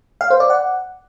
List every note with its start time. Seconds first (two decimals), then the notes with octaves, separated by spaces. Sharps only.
0.21 F5
0.30 C5
0.40 D5
0.50 F#5